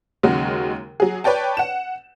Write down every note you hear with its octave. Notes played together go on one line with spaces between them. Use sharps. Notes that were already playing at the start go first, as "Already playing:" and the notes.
D#2 C#3 F#3 G#3 F#4
F#3 G#4
B4 C#5 D5 G5 A5
F#5 E7